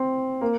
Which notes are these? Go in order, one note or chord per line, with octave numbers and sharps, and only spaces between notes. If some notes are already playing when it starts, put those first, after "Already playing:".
Already playing: C4
A#3